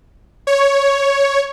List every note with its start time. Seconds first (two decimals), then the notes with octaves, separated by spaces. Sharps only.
0.47 C#5